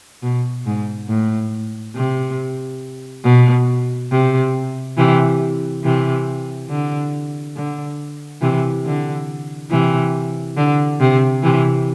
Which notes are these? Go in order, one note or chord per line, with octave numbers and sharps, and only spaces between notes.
B2
G#2
A2
C3
B2
C3
C3 E3
C3 E3
D3
D3
C3 E3
D3
C3 E3
D3
C3
C3 E3